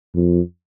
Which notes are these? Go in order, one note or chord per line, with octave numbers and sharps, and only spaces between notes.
F2